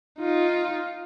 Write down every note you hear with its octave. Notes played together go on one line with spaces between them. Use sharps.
D#4 F4